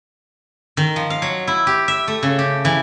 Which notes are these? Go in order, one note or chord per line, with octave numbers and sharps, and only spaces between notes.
D#3
F3
F5
F#3
E4
G4
E5
A3
C#3
G4
E3